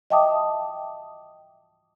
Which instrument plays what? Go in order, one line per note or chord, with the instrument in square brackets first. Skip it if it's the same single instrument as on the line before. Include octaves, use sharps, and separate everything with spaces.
[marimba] D#5 E5 G5 A5 D6 D#6